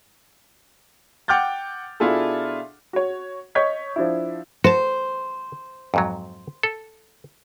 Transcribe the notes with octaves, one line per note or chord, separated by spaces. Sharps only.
F#5 G5 D6 F6 G6 A6
B2 D4 E4 F4 G#4 A4
F#4 C#5
C#5 D#5 C#6 G6 G#6 B6
F3 D4 E4
F#4 C5 A5
F2 G#2 F#3
A4